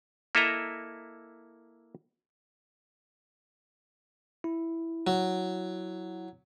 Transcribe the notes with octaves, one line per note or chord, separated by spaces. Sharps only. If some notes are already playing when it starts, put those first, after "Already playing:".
A#3 E4 A4 D#5 E5 A#5
E4
F#3